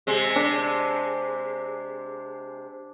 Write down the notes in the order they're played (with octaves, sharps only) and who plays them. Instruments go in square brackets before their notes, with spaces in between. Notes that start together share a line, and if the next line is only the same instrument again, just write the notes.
[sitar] C3 G#3
[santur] D4